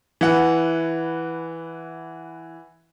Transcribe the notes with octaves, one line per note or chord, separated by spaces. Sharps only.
E3 F#5